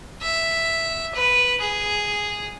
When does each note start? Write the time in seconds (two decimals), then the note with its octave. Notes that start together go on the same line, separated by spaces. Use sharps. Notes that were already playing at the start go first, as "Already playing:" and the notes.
0.22 E5
1.15 B4
1.60 G#4